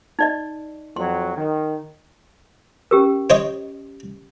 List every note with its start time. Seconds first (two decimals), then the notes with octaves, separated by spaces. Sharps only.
0.19 D#4 D5 D#5
0.96 F2 F#3 C6
1.37 D#3
2.91 C#4 G4 A#4
3.30 C5 C#5 D#5